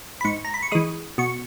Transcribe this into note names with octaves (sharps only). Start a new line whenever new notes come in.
B5
G#2 C#6
A#5
B5
C#6
E3 G#3 D#6
B2 C#6